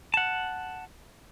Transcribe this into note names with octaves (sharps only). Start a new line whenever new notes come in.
F#5 A5